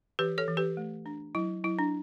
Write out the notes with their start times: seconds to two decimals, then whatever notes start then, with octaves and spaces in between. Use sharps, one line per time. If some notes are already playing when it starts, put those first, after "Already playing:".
0.19 E3 G4 B4
0.38 A4 C#5
0.48 E3
0.57 G4 B4
0.77 A3
1.06 D4
1.35 F#3 E4
1.64 F#3 E4
1.79 D4